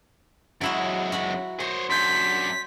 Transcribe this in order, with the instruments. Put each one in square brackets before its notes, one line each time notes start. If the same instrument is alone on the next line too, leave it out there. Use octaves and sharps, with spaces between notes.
[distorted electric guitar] F#2 G#3 [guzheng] F#3 E4 F#4
[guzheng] F#4 F#5 B5
[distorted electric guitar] C5 C#5 [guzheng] D#5
[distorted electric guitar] F#2 D4 [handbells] C6 G6 G#6 [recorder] B6